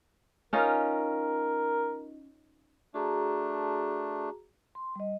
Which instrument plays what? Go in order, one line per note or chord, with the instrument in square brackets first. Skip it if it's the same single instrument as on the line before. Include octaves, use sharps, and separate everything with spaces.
[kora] C#4 D#4 F4 [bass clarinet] A#4
[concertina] A3 D4 [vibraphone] F#4 G#4 A#5
[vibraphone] C6
G3 D#5